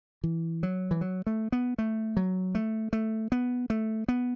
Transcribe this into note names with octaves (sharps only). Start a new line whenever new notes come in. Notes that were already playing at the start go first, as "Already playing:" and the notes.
E3
F#3
E3
F#3
A3
B3
A3
F#3
A3
A3
B3
A3
B3